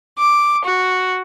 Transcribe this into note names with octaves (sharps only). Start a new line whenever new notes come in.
D6
F#4